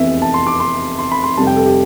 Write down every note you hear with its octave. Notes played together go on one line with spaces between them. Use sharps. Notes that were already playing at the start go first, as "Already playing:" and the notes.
Already playing: F1 E2 C3 E3 E5
A5
C6
D6
C6
C6
B5
C6
F1 F2 C3 G3 A5
G5
A4
G4